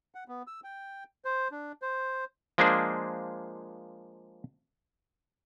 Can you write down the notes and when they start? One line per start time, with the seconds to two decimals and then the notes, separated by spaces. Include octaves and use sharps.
0.15 F#5
0.28 B3
0.47 E6
0.64 G5
1.25 C5
1.51 D4
1.82 C5
2.58 F3 G#3 A#3 D4 G#4 C5